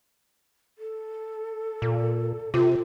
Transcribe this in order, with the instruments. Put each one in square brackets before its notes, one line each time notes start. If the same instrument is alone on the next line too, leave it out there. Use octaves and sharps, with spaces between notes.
[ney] A4
[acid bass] A#2
[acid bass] C3 [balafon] F4